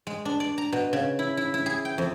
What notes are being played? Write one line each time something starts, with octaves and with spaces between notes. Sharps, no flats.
G#3
D4
D5
A#5
B2
C#3
E4
E4
E4
G#4
G5
F2